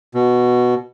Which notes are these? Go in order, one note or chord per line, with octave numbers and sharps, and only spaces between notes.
B2